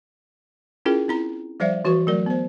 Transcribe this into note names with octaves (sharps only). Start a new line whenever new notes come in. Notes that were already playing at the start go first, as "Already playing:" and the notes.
C#4 E4 F4 G#4 A#4 G5
C4 E4 A#5
F3 G3 C5 D5 E5 F5
E3 F#4 B4 C#6
F#3 A3 A#4 D5
B3 C5